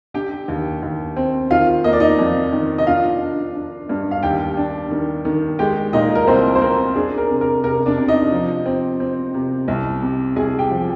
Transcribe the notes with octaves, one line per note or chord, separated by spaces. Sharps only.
D3 G4 G5
D#2
D#2
C4
D#3 F4 F5
A#3 D#5
D5
D#4 D#5
F2
D#3
D#5
D4 F4 F5
D4
D4
G2
F5
D#2 G4 G5
D4
D#3
D#3
G#3 G4 G5
A#2 D#4 D#5
A#4
C2 C4 C5
C5
C4 A#4
D4 G#4
A#4
C3
A#4
C3 A#4
D4 D5
C3
D#4 D#5
F3
C4
C4
C3
C2
C3
C2 G#4 G#5
G4 G5
F3